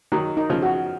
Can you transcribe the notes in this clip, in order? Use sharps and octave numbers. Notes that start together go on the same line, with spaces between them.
D#3 F#3 D#4
D#4
C#3 F3
F#4